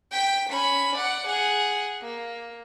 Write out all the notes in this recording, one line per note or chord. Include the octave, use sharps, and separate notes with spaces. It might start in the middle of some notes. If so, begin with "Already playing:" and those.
G5 B6
C#4 B5
D5 F#5
G#4 F#5
A#3